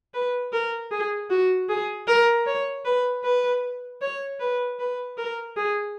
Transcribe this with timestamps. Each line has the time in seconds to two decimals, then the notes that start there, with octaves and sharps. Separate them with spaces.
0.14 B4
0.53 A#4
0.91 G#4
1.30 F#4
1.69 G#4
2.08 A#4
2.47 C#5
2.85 B4
3.24 B4
4.02 C#5
4.40 B4
4.79 B4
5.18 A#4
5.57 G#4